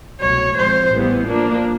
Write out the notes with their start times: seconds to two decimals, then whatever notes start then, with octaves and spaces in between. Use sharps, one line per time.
0.20 C2 B2 F#3 A3 C#5
0.56 A#2 F3 G#3 C4 C5
0.91 A1 A2 E3 G3 B3
1.27 F3 A#3 D4